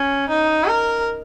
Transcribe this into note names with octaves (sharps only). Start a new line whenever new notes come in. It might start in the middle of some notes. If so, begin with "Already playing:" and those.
Already playing: C#4
D#4
A#4